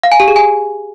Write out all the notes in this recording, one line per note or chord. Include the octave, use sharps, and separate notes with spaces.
F5
G#5
G4
G#4
G#5